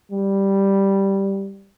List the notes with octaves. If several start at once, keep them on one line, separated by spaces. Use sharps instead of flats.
G3